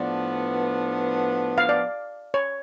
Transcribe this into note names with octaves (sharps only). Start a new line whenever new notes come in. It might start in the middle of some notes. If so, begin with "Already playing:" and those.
Already playing: A2 F3 B3 D4 D5
F5
D5
C#5